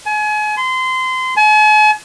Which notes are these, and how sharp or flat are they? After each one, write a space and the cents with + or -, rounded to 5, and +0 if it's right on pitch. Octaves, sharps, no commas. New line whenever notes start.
G#5 +35
C6 -25
G#5 +45